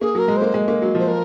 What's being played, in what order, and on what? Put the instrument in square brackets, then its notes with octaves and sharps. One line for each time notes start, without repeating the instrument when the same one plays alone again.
[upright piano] A#3 [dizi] G#4
[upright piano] F#3 [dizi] A#4
[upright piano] G#3
[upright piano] A#3 [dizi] C5
[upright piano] G#3
A#3
F#3
[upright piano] F3 [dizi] C5
[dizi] A#4